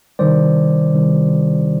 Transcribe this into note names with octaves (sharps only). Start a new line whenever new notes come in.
C3 D#3 G3 C5 D5
C3 D#3 G3